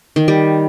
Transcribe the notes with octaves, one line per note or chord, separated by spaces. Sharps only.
D#3
G3